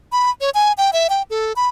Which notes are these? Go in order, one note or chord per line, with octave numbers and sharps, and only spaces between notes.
B5
C#5
G#5
G5
E5
G5
A4
B5